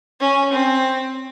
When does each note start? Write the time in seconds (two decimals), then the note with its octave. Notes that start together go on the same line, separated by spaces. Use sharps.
0.20 C#4
0.53 C4